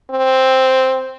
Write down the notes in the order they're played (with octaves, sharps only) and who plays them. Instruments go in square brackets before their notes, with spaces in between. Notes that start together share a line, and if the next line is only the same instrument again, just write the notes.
[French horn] C4